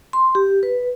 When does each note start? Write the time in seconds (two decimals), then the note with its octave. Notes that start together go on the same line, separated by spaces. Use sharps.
0.13 C6
0.35 G4
0.63 B4